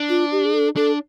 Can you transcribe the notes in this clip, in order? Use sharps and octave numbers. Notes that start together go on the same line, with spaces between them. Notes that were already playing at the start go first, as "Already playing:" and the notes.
Already playing: D4
F4
G4
G#4
A4
D4 A4